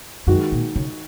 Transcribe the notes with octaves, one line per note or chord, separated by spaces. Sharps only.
F#2 D#3 G#3 F#4
A#2
C#3